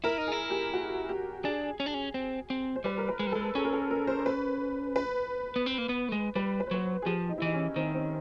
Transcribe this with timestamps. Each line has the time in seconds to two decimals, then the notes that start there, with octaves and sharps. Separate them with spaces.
0.04 E4 A#4
0.18 D#4
0.27 E4 G#4
0.50 G4
0.74 F#4
1.09 G4
1.44 D4 G#4
1.80 C#4
1.86 D4
1.94 C#4
2.14 C4
2.50 C4
2.76 C5
2.84 G3 B4
2.98 A#4
3.09 B4
3.19 G#3
3.27 G3
3.32 G#3 A4
3.55 C#4 G#4
3.65 A#4
3.73 A4
3.91 A#4
4.07 C5
4.26 B4
4.96 B4
5.56 B3
5.66 C4
5.78 A#3
5.89 B3
6.09 A3
6.12 G#3
6.35 G3 B4
6.60 B4
6.67 C5
6.71 F#3 B4
7.02 G#4
7.06 F3 G4
7.29 D#4
7.38 E4
7.42 E3 D#4
7.54 C#4
7.76 D#3 C4
7.95 C4